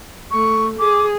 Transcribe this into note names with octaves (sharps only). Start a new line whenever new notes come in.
A3 C#6
G#4 D6